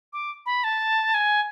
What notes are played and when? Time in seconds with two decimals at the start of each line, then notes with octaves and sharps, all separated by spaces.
0.13 D6
0.46 B5
0.64 A5
1.14 G#5